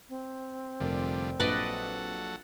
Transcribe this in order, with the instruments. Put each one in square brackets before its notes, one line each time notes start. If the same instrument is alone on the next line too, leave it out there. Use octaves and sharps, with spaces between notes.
[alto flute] C4
[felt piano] F1 A#4 [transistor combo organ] D3 F3 G3
[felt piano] A#1 [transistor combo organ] F#3 A4 F#5 [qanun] B4 D5 D#5